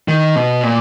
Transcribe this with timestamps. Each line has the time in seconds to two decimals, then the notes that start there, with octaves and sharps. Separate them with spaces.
0.08 D#3
0.36 B2
0.63 A#2